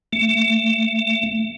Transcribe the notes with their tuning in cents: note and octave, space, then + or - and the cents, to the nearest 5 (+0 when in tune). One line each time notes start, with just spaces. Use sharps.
A3 +30